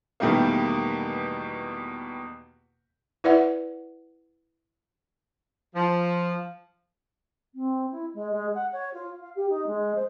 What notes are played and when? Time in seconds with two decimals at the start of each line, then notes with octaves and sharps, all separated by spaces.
0.20 E2 B2 D#3 G3 A3 A#3
3.24 E4 B4 D5 E5 F#5
5.75 F3
7.54 C4
7.91 E4
8.14 G#3
8.32 G#3
8.54 F#5
8.72 C#5
8.93 F4
9.20 F5
9.35 G4
9.49 D#4
9.66 G#3
9.94 C5